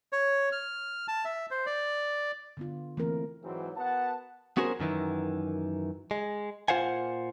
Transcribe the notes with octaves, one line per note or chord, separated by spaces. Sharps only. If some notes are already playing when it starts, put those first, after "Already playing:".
C#5
F6
A5
E5
C5
D5
D3 B3 F4
E3 A3 A#3 C4 A#4
G#2 E3 F#3 C4
B3 F#4 A#4 F#5 A5
B3 C#4 F#4 G#4 A#4 C5
F#2 D#3 E3
G#3
A#2 F4 C5 F5 F#5 G#5